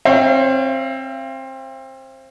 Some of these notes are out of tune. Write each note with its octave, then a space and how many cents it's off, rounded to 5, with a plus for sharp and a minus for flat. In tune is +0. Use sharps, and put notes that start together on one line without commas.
C4 +20 C#5 +0 F5 -35